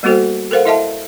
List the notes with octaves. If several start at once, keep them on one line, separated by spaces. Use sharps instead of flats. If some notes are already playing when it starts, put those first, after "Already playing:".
G3 A#3 B3 F#4 A4 C5
A4 A#4 C5 F5 F#5
E4 A4 D#5 E5 F#5 A5